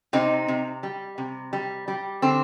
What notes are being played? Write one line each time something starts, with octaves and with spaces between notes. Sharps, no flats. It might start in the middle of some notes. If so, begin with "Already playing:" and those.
C3 C4 D#4
C3
G3
C3
G3
G3
D3 C4